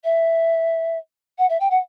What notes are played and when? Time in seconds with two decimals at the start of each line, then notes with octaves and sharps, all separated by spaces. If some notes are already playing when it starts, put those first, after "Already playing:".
0.04 E5
1.38 F#5
1.49 E5
1.60 G5
1.71 F#5